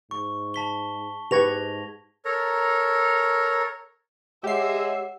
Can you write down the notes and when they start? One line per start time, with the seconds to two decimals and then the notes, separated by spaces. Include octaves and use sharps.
0.11 G#2 C#6
0.54 A5 B6 G7
1.31 G#2 G4 B4 C#6 G#6 A#6 F7
2.25 A4 A#4 C#5 A#5
4.44 G#3 G4 C#5 E5 F#5 C7